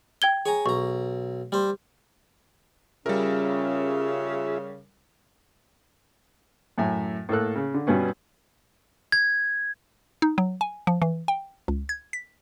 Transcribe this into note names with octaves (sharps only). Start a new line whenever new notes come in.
G5 G#6 G7
G#4 C#5 G#5 A#5
B1 A#5 C#6
G3 C5
C#3 G3 C#4 F4 G#4 A#4 E5
F#2 A2 E5 G#5
A2 A#3 A4 F#6
C#3
D3
G2 B2 B3 C#4
G#6
D#4
F#3
G#5
F3
E3
G5
C#2
G#6
B6